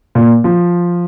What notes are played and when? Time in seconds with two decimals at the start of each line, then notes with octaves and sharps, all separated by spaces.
0.15 A#2
0.44 F3